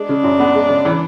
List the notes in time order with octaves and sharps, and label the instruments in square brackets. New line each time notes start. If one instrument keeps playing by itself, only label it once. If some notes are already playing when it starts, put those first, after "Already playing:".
Already playing: [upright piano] G#3 [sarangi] D4
[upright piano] C#3
F#2
B3
G#3
C#3
E3